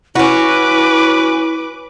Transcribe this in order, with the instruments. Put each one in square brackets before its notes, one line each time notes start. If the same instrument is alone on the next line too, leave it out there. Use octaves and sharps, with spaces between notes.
[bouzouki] C#4 F#4 [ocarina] E4 [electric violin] B4 D6